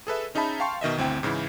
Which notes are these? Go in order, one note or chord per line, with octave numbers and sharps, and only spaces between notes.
G#4 A4 B4 E5
C#4 D#4 G#4 E5 A5 B5
F5 G5 A5 C6 C#6
B2 D#3 D#5 E5
G1 D2 C4 E4 G5
G#2 C#3 E3 E4